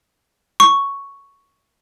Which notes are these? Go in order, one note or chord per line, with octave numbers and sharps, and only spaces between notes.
C#6